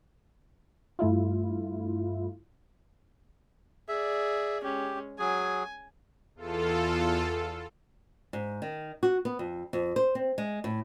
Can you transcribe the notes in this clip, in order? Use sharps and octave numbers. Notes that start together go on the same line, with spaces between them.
G2 A3 E4 F4
G#4 D5 E5
G#3 C#4 G4
F#3 G#4 G#5
E2 F4 A4
G#2
D#3
F#4
B3
F2
F2
C5
C4
G#3
A2